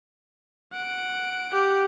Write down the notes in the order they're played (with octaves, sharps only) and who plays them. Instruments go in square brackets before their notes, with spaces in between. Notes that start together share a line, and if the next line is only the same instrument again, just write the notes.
[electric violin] F#5 D7
[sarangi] G4